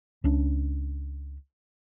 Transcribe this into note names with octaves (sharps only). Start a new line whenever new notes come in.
C#2 C#4 D4